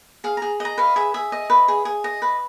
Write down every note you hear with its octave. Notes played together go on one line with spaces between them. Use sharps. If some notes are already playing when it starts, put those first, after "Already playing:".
G#4 F5
G#4 A#5
D#5 A#5
B4 F5
G#4 E5
G#4 E5
D#5
B4
G#4
G#4
D#5
B4